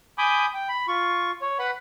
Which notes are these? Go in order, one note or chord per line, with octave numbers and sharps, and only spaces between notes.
G#5 B5 D6 D#6 G6
G5
B5
F4 C#6
C#5
B4 F#5 B5